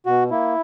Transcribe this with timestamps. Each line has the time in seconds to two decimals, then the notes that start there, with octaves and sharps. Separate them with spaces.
0.06 B2 F#4
0.31 A#3 E4